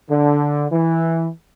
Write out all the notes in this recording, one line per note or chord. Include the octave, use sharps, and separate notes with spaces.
D3
E3